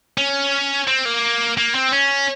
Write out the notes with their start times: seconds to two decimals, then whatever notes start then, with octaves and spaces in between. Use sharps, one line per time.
0.18 C#4
0.87 C4
1.05 A#3
1.58 A#3
1.75 C4
1.92 C#4